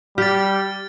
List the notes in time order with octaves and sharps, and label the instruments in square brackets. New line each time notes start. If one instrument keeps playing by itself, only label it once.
[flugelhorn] G3 [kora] G4 [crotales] F6 A6